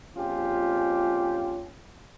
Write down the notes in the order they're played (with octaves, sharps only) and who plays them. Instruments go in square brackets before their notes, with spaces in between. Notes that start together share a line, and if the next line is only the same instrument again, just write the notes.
[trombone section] A#1 F2 C#4 F4 G4